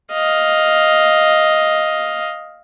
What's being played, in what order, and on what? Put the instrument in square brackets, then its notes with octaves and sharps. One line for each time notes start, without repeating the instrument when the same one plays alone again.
[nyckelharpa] D#5 F5